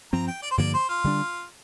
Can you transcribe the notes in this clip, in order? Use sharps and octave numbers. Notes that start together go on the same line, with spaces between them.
G2 F3 C4 A#5
G5
D5
C5
G2 D3 F3 A#3 D5
C5
F4
D3 G3 D4